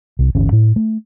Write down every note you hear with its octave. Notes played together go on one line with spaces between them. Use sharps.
C2
D1 G1 E3 C#4
A2
A3